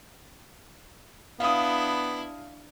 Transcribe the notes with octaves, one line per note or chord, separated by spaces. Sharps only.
B3 D4 E4 F5 D#6